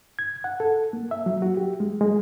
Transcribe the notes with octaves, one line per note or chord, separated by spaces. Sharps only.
G#6
F#5
A4
A#3
E5
F#3
F#4
G4
G#3
G#3